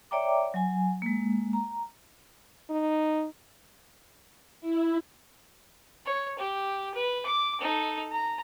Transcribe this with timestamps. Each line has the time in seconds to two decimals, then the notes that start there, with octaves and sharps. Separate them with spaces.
0.11 C#5 D5 E5 G5 A#5 D6
0.54 F#3 G#5
1.02 G#3 A#3
1.53 A#5
2.70 D#4
4.61 E4
6.06 C#5
6.39 G4
6.95 B4
7.26 D6
7.61 D#4 A4
8.12 A#5